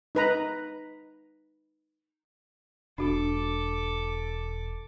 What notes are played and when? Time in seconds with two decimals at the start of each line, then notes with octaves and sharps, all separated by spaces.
0.15 D#4 B4 A#5
2.98 E1 D4 F#4 A4 D6